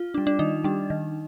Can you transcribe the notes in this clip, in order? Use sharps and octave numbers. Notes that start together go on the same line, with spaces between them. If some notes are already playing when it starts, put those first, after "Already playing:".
Already playing: F4
D4
G3
D4
D#3 D#4
G3 D4
D#3